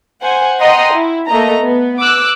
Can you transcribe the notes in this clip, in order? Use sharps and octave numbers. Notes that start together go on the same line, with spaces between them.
C5 F#5 G#5
D#5 F#5 G5 A#5 C6 D#6
E4
A3 A#3 D#5 A#5
B3
D6 E6 F#6